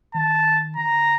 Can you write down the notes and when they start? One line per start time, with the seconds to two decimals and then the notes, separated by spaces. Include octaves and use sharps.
0.15 D#3 A5
0.76 D3 A#5